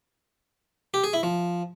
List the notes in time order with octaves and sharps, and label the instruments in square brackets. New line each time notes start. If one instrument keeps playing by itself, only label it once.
[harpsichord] G4
G#4
E4
F3